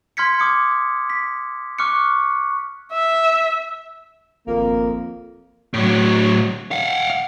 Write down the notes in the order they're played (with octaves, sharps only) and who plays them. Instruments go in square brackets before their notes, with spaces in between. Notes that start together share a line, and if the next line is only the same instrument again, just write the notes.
[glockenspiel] C6 F6 G#6 B6 C#7
D6 D#6 G#6 C#7
B6
C#6 D6 F6 F#6 C#7
[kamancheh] E5
[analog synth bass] G#1 [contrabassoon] F2 [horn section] A#3
[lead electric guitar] A2 F#3
F5 F#5